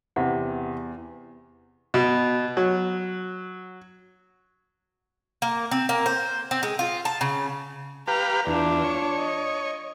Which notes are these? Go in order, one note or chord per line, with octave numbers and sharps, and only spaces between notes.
E2 C3 F#5
B2
F#3
A#3
C4
A#3
C5
C4
G#3
F4
A5
C#3
G4 B4 F5 A#5
E2 D4 F4
C#5
D#5